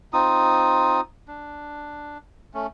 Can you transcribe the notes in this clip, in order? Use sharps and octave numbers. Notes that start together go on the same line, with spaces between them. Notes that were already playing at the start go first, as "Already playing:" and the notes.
C4 D#4 F4 D#6
D4
A3 C#4